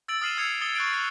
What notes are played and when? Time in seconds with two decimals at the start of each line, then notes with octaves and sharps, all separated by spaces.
0.08 E6 A6 D7 F#7
0.21 D#6 F6 C7 D#7 E7
0.37 D#6 E6 G#6 C7 C#7 F7
0.61 D#6 A6 C#7 G7
0.75 C#6 F#6 A6 D7
0.93 F#6 C7